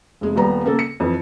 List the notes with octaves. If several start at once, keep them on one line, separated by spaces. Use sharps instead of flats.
F1 G#3
D#1 G3 B3 A#5
C#3 A#3 A4
C#7
F2 E3